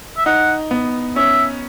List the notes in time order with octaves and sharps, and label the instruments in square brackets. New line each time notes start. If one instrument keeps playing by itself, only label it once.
[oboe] E5
[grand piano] D#4 [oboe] F#5
[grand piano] B3
[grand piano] C#4 [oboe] E5